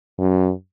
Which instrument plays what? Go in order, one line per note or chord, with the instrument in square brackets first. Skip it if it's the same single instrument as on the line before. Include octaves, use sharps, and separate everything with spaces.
[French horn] F#2